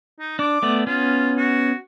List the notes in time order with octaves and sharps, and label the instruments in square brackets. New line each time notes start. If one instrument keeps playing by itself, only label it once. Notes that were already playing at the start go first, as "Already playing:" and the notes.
[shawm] D#4
[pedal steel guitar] D4 [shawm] D6
[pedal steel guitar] A3 B3 D5
[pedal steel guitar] B3 C#4 [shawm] F4
[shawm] F#4